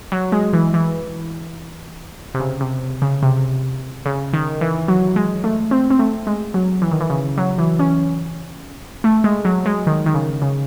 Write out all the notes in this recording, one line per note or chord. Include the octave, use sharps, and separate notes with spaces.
F#3
G#3
E3
E3
C3
C#3
C3
C#3
C3
C#3
D#3
E3
F#3
G#3
A3
C4
C4
A3
G#3
F#3
E3
D#3
E3
C#3
F#3
E3
C#4
A3
G#3
F#3
G#3
D#3
D#3
C#3
C#3